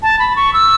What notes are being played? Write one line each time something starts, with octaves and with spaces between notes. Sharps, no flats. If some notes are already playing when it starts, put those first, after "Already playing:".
A5
B5
C#6
E6